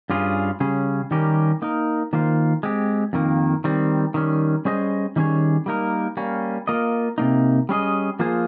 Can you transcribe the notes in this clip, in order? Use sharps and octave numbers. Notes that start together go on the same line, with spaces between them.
G2 G3 C#4 F4 G#4
C#3 G3 C#4 G#4
D#3 G3 C#4 G4 A#4
A#3 D#4 A#4
D#3 A#3 F4 C5
G#3 C4 G4
F2 D#3 A#3
D#3 G3 C4
D#3 G3 C#4
G3 C#4 G#4 C5 D#5
D#3 G3 C#4 G#4 C#5
G3 A#3 D#4 A#4
G3 A#3 C#4
A#3 F4 A#4 D#5
C3 D#3 A#3 D#4
G3 C#4 G#4 D#5
F3 A#3 F4 G#4 C5